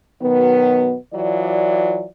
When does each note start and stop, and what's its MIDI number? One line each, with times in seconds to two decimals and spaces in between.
0.22 0.95 47
0.22 0.95 51
0.22 0.95 54
0.22 0.95 59
1.14 2.05 52
1.14 2.05 54
1.14 2.05 65
1.14 2.05 74